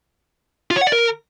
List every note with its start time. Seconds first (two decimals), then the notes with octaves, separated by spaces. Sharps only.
0.71 F4
0.76 C#5
0.81 F#5
0.87 D5
0.92 A#4